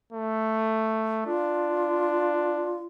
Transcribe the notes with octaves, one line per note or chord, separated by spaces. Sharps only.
A3
D4 F4